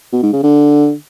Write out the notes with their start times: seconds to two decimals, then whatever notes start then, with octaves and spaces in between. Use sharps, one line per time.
0.13 B2
0.23 G#2
0.33 C#3
0.43 D3